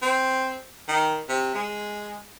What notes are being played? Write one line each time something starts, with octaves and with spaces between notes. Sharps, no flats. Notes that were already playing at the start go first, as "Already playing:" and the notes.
C4
D#3
C3
G#3